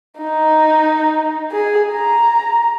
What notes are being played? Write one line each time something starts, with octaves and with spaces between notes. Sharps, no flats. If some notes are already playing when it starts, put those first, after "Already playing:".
D#4
G#4
A#5